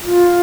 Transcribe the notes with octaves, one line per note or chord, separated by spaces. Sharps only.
F4